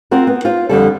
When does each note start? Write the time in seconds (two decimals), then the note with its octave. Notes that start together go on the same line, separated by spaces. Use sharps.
0.11 C4 F4 F#4 A#4
0.27 B3
0.45 F4 C5
0.69 F2 D3 G3 A4